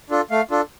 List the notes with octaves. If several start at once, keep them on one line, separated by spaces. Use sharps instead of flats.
D4 F4 A4
A3 F5
D4 F4 A4